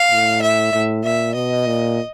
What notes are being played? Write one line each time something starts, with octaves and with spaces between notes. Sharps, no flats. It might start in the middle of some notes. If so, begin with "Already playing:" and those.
Already playing: F5
A2
E5
A2
A#2 E5
B2 D#5
A#2